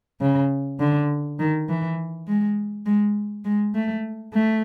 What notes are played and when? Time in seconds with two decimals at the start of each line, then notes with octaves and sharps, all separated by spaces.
0.21 C#3
0.79 D3
1.39 D#3
1.69 E3
2.27 G#3
2.86 G#3
3.45 G#3
3.74 A3
4.34 A3